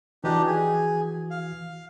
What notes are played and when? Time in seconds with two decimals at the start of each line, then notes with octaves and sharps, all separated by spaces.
0.24 E3 D4 D#4 F#4 G4
0.46 G#4
1.31 F5